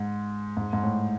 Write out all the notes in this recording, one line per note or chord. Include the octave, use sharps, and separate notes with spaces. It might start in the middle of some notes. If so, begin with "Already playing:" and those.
Already playing: G#2
G#2
G#2
A2